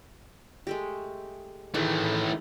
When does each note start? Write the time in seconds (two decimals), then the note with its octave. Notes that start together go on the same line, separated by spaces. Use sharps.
0.67 G#3 A3 G4
1.74 D#3 E3 A3 E4 G#4